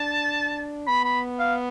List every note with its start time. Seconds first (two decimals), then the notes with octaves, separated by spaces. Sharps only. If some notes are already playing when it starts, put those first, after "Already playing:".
Already playing: D4 A5
0.87 B3 B5
1.04 B5
1.39 F5